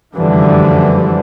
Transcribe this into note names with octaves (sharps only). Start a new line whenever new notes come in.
F1 F#2 D3 E3 F3 G3